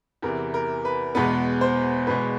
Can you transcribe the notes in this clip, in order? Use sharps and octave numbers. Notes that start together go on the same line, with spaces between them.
E2 C3 E3 A#4
A#4
B4
E2 B2 G#3 B3 B4
C5
E2 B2 G#3 B4